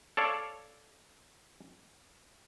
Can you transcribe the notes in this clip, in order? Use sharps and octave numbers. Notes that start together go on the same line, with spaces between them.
A4 C#5 D5 F5